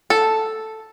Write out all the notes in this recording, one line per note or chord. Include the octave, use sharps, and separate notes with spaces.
A4